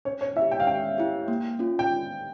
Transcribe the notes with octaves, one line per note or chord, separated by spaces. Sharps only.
C#4 C#5
C#5
E4 E5
G4
G5
F5
C#4 G5
E4 G4
A#3
C#4 F4
G5